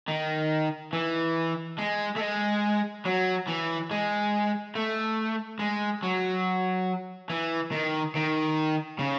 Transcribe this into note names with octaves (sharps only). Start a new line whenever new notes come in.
D#3
E3
G#3
A3
G#3
F#3
E3
G#3
A3
G#3
F#3
E3
D#3
D#3
C#3